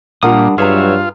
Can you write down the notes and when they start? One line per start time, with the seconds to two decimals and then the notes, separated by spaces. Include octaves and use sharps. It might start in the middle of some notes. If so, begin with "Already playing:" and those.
0.23 A#2 G3 D4 F4 A#4 F#5 D#6
0.58 G2 F#3 F4 G#4 B4 C#5 E5 A#5